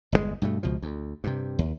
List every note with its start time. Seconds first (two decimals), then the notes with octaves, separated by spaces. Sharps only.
0.12 G1 E2 A#2 G#3
0.42 G2 B2 A3
0.63 C#2 B2 F3
0.82 D2
1.24 G2 C3
1.59 D#2